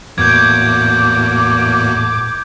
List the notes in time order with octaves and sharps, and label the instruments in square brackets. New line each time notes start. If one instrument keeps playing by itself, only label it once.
[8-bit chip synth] E2 A#3 F#4 [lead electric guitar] A2 [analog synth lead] D6 [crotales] G6 G#6